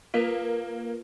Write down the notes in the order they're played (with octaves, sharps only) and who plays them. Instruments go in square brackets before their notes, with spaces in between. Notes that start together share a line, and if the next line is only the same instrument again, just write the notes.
[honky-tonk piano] A#3 [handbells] F4 A#4 B4